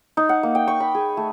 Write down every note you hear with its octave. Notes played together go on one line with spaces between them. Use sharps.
D#4
F#5
A#3
G5
C#6
B5
G#4
A3